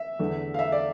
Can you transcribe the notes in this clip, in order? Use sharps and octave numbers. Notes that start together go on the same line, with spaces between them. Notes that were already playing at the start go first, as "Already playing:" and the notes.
Already playing: E5
E2 D3 A3
F5
E5
D5